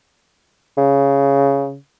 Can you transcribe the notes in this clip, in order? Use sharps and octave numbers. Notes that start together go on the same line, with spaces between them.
C#3